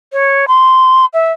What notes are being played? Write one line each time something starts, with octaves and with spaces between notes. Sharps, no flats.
C#5
C6
E5